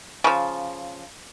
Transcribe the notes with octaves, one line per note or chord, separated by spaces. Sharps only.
C#3 F3